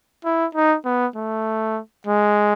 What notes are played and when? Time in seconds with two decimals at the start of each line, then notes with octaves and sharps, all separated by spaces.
0.25 E4
0.55 D#4
0.85 B3
1.16 A3
2.07 G#3